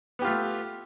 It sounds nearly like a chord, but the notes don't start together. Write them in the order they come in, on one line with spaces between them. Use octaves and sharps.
B3 G4 F4 A3